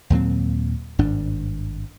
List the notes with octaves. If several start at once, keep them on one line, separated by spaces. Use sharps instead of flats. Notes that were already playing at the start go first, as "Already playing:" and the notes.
D#2 A#2 F#3 C4
G#1 G2 D4